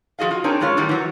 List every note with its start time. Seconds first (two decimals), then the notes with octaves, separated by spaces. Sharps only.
0.19 F3 F#4 G#4 D#5 F5
0.31 F4
0.44 C4 D4 D#4 G#4 A#4 C#5
0.60 F#2 B2 G#3 F4 C#5 E5
0.77 A2 D#3 G3
0.89 E3 F#3 C#5